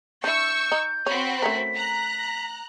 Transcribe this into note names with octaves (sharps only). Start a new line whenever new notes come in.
D4 E4 C#6 E6 G6
D#4
C4 F#4 C#5 B5
A3 C#4 A#4 B6
A#5 F#6